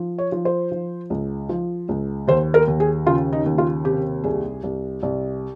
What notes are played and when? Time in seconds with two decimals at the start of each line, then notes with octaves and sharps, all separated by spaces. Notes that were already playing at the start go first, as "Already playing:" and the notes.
Already playing: F3
0.18 C#5
0.32 F3
0.45 C5
0.72 F3
1.10 C#2
1.49 F3
1.89 C#2
2.27 D#2 C5
2.54 A#4
2.67 D#2
2.80 G#4
3.06 C#3 F4
3.33 D#4
3.46 D#2
3.58 F4
3.84 C3 G4
4.24 C2 G#4
4.63 C2
5.03 C2